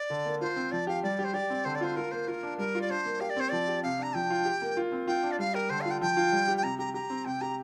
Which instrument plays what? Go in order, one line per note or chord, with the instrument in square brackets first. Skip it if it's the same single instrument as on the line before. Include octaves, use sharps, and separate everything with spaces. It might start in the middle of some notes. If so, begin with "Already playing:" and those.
Already playing: [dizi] D5
[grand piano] D3
A#3
[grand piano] F4 [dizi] C5
[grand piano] C4
[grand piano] F3 [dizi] D5
[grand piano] G4 [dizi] F5
[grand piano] G3 [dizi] D5
[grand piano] G4
[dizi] C5
[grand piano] G4 [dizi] D5
[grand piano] C4
[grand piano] D3 [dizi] C5
[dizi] D5
[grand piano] F4 [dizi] C5
[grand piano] F4 [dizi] A#4
[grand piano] A#3 [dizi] C5
[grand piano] F4 [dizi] A#4
[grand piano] D4
[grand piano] G3 [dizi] A#4
[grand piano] F4
[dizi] D5
[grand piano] D4 [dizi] C5
[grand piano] A#3
[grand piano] G4 [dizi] F5
[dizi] D5
[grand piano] C4 [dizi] C5
[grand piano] F3 [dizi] D5
[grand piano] G4
[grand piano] C3 [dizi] F5
[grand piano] D4 [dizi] A#5
[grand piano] F3 [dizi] G5
[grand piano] F4
G4
A#3
F4
C4
[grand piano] F4 [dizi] G5
[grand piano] D4
[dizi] D5
[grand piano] G3 [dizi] F5
[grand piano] G4 [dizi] A#4
[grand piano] D3 [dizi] C5
[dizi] F5
[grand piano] F4
[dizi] G5
[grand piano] F3 [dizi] G5
[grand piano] F4
G3
G4
[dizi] G5
[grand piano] C3 [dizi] A#5
[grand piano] G4 [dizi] A#5
[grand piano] G4 [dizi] A#5
[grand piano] C4
[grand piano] C3 [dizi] G5
[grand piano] G4 [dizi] A#5